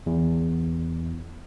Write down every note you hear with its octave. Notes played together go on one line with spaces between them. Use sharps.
E2